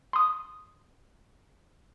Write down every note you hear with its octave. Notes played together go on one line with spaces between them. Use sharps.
C6 D#6